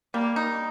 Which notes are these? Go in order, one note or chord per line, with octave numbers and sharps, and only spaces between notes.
G3 A#3
D#4